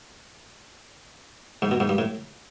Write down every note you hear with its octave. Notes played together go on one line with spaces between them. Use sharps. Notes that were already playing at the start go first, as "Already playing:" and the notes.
G#2
B2
G#2
G2
A2